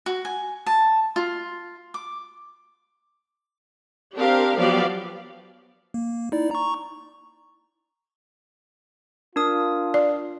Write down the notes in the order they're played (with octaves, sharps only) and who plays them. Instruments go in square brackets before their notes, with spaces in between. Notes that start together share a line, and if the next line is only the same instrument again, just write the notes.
[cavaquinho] F#4
G#5
A5
F4
D6
[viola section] C4 D4 G4 A#4 F5
F3 F#3 B3 G4 D5 F5
[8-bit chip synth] A#3
D#4 E4 D5
A#5 C#6
[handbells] D4 A#4 D#6 [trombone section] F4
[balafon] D5